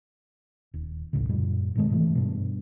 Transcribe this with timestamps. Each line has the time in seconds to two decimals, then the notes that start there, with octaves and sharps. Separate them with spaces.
0.74 D#1
1.13 D1 A1 D#2 C#3
1.29 F#2 A#2 G3
1.75 G#2 C3 D#3 G#3
1.90 G#2 B2 E3 A3
2.15 G2 B2